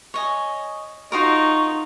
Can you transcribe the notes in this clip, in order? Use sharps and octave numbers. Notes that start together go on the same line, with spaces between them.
C#5 D#5 G#5
D#4 F4 F#4 A#4 C#6